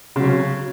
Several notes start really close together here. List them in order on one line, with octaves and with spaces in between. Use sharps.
C#3 F#3 C#4